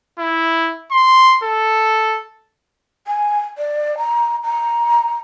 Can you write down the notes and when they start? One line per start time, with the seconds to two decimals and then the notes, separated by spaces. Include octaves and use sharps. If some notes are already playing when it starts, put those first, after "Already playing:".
0.19 E4
0.92 C6
1.44 A4
3.07 G#5
3.58 D5
3.97 A#5
4.43 A#5